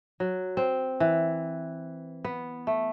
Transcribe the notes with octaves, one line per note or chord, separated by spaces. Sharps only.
F#3
C4
E3
B3
A3